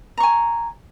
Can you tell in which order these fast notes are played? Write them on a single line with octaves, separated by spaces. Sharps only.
A#5 C#6 G#5